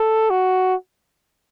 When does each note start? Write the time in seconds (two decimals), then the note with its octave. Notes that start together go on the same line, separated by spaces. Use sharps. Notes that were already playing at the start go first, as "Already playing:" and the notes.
Already playing: A4
0.30 F#4